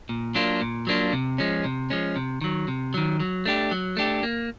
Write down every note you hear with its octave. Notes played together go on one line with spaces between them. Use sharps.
A#2
F#3 A#3 D4 F4
A#2
F#3 A#3 D4 F4
C3
F3 G#3 C#4
C3
F3 G#3 C#4
C3
D#3 F#3
C3
D#3 F#3
F#3
A3 D4 G4
F#3
A3 D4 G4
A#3